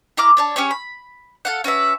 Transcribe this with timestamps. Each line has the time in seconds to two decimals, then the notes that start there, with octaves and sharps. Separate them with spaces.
0.17 E4 A#5 D6 F6
0.37 D4 C#5 A5
0.56 C#4 G4 G#4 C#5
0.71 B5
1.45 A4 F5 F#5
1.64 C#4 F#4 B4 E5